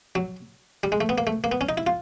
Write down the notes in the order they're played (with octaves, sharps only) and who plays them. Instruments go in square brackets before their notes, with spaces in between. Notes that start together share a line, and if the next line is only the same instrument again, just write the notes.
[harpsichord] F#3
G3
G#3
A3
B3
A#3
A3
A#3
B3
C#4
D#4
E4
F4